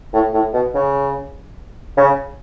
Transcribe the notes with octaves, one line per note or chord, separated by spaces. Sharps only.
A2
A2
B2
C#3
C#3